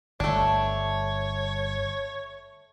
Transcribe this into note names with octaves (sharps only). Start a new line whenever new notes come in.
G1 A3 D4 C#5